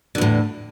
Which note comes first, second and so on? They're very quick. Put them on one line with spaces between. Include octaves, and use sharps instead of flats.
D3 E2 A2